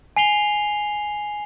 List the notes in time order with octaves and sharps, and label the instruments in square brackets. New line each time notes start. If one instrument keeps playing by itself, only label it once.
[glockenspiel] G#5 C7 F7 G7